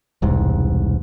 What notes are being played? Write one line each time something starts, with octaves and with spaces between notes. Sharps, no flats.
E1 C2 G#2